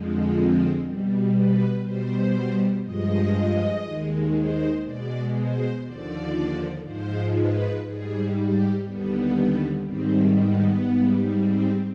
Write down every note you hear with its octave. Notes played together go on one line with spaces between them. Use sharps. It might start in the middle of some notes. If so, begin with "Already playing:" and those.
Already playing: F2 D3 F3 G#3
C4
B2 G3
B4
B2 G3 C5
G2 F3 G#3 D#5
D#2 D#3 G#3
C5
B2 G#3 D5
C5
D#2 D3 F3 D5
G#2 F3 G#3 C5
B4
G#2 G3 G#4
G4
D#2 D3 G3 B3
G#2 D#3 G3 C4
B3
G#2 G3
C4